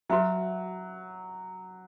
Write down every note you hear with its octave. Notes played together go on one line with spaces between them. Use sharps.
F#3 F#4 B4 E5